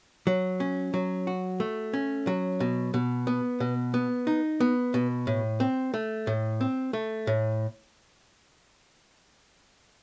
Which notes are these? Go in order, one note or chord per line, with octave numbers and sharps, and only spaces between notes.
F#3
C#4
F#3
F#4
A3
C#4
F#3
B2
B2
B3
B2
B3
D#4
B3
B2
A2
C4
A3
A2
C4
A3
A2